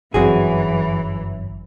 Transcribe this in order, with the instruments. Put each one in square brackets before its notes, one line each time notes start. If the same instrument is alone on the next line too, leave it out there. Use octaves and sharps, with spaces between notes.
[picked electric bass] G1 F#2 [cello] E3 F#3 [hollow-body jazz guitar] C4 F#4 G#4